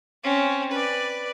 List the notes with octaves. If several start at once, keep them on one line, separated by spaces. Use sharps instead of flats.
C4 C#4
B4 D5